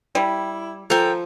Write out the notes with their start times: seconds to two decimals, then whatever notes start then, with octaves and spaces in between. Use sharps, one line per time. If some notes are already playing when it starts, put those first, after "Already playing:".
0.15 G3 E4
0.90 F3 A4 A#4 G5 G#5